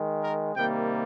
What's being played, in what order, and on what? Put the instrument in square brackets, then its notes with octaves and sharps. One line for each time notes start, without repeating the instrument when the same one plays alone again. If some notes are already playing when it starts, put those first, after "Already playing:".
Already playing: [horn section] D#3 G#3
A#4
C3 D#3 G3 A#3 G5